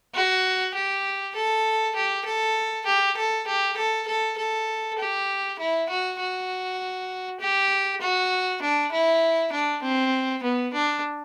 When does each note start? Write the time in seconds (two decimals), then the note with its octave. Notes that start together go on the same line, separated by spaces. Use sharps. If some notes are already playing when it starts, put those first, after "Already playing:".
0.15 F#4
0.75 G4
1.36 A4
1.96 G4
2.26 A4
2.86 G4
3.17 A4
3.47 G4
3.77 A4
4.07 A4
4.38 A4
4.99 G4
5.59 E4
5.89 F#4
6.20 F#4
7.40 G4
8.01 F#4
8.62 D4
8.92 E4
9.52 D4
9.82 C4
10.43 B3
10.73 D4